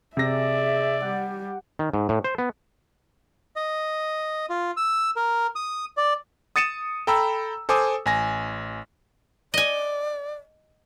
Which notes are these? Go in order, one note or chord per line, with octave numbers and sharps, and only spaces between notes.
C3 G#4 D5 E5 A#6
G3 G4 F#5
D#3
G#2
A2
C5
B3
D#5
F4
E6
A#4
D#6
D5
D#6 A6 C#7 D#7 E7
A4 G5 A#5 B5 E6
A4 C5 G#5 D6 D#6
A1 G#5 A#6
D5 D#5 G#5